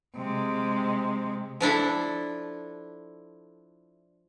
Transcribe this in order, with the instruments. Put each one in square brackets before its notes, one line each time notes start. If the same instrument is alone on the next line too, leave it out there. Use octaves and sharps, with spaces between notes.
[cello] C3 G#3
[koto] F3 D4 E4 A4